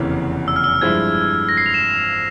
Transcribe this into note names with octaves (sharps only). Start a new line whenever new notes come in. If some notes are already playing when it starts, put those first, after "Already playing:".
Already playing: F1 E2 C#3 E3 A#3
E6
F6
E6
G2 F3 G#3 E4 G#6
A#6
C7
F7
E7